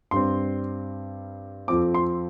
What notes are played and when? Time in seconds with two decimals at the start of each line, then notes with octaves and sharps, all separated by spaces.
0.11 G2 G3 C4 C6
1.68 F2 F3 C4 D6
1.95 C6